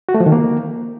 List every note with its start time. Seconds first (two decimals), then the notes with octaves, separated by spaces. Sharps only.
0.09 F#4
0.14 A3
0.20 F3
0.26 D#3
0.32 A#3